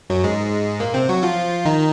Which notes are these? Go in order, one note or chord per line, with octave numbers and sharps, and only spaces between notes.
F#2 F#3
G#2 G#3
A#2 A#3
C3 C4
F#3 F#4
F3 F4
D#3 D#4